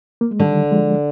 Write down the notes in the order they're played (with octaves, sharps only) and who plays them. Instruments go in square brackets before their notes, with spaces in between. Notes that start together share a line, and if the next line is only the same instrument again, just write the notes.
[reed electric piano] A#3
G#3
[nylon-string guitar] D3 [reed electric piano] D#3 G3
[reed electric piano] F3 G#3